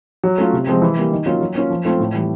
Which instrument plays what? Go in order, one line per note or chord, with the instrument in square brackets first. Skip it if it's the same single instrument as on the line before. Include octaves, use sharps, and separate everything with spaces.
[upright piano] F#3
A3 C#4 F4
C3
F3 G#3 C4
E3
G3 A#3
D#3
F#3 A#3 C#4 F4
F#3
A#3 C#4 F4
F3
A3 C4 F4
A2
E3 G3